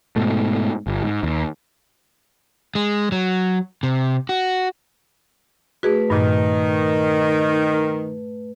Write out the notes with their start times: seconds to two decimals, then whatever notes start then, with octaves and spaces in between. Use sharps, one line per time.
0.16 G#2 B2 A3
0.87 G1
1.03 G#2
1.23 D#2
2.75 G#3
3.12 F#3
3.83 C3
4.29 F#4
5.83 A3 F#4 G#4 B4
6.10 G2 A#2 D#3